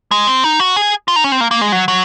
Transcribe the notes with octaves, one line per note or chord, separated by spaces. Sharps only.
G#3
C4
D#4
F#4
G#4
F4
D#4
C#4
C4
A#3
A#3
G#3
F#3
F#3